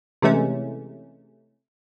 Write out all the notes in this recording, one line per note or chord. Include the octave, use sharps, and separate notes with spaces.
C3 E3 G#3 A3 C#4